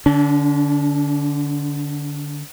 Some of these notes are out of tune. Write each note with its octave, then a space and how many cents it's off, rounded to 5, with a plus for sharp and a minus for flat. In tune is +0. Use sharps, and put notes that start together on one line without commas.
D3 +0 D4 -45